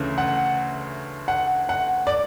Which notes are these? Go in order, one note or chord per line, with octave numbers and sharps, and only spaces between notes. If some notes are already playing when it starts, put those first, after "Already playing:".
Already playing: D2 C#3 E3 A3
F#5
F#5
F#5
D5